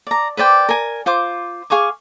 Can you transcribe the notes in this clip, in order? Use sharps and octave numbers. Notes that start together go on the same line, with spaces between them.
D5 A#5
B4 C5 D5 G5
A#4 G#5
F4 C5 D6
G#4 F5 C#6 D6